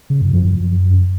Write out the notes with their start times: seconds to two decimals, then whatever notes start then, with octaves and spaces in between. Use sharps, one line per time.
0.10 C#3
0.22 F#2
0.33 F3
0.45 F#2